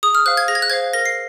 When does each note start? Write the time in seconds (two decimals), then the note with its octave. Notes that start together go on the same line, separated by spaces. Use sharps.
0.03 G#4 D#6
0.15 F6
0.26 C5 F5 F#6
0.37 G#6
0.48 G#4 A#6
0.55 G#6
0.62 F#6
0.70 C5 F5 G#6
0.93 A#4 A#6
1.05 C7